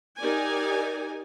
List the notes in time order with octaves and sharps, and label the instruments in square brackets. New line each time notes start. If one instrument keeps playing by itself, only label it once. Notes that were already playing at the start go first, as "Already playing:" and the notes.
[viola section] D#4 G4 A#4 D5 G#5